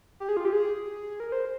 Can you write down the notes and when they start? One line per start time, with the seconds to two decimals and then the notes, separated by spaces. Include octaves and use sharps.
0.20 G4
0.29 G#4
0.37 F4
0.45 G4
0.53 G#4
1.20 A#4
1.32 C5